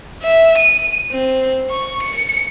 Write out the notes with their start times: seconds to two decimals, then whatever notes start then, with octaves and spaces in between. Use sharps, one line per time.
0.23 E5
0.58 D#7
1.12 C4
1.70 C#6
2.03 C#7